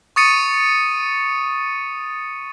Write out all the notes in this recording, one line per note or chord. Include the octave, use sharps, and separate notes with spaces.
C#6 D#6 A6 C#7 D#7